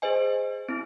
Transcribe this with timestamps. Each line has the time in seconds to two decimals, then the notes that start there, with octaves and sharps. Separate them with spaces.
0.02 G#4 C5 D#5 G#5
0.69 C4 E4